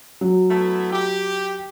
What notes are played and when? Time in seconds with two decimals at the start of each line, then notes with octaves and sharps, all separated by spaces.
0.21 F#3
0.50 A3 B3 E4
0.92 G4